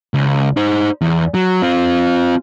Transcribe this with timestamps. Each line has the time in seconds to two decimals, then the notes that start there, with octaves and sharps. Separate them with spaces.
0.14 C#2
0.57 D#4 C5
1.01 E2
1.34 F#3
1.62 C4 F4